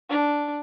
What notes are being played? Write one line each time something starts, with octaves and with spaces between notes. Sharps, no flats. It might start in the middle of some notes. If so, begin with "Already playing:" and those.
D4